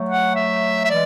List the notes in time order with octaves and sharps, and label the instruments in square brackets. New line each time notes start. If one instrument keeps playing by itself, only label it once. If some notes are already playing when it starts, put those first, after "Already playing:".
Already playing: [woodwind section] F#3 A3
[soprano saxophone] F#5
E5
E5
[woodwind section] E3 G#3 [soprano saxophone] D5